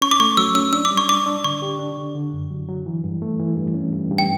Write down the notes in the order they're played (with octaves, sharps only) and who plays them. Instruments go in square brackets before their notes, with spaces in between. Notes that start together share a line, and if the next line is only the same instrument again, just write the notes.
[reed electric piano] C#4 [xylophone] C#6
[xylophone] D6
[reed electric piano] A3 [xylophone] C#6
[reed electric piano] F#3 [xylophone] E6
[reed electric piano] C#4 [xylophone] E6
[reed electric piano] D4 [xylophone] E6
[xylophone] D6
[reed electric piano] G3
[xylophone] C#6
[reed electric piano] D4 [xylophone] D6
[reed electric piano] D4
[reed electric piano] D3 [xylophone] C#6
[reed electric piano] G4
D4
D3
D3
F#2
F#3
F#3
E3
G2
A3
E3
G2
C#4
G2
G2
[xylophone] G5